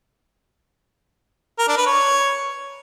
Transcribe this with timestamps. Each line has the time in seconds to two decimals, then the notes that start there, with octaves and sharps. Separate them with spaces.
1.59 A#4
1.68 D4
1.77 B4
1.87 C#5